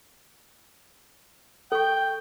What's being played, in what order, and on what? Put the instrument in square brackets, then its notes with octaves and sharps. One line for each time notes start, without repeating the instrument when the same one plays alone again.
[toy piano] A4 C#6 [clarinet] G5